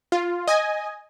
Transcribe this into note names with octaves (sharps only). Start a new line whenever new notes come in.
F4
D#5 G#5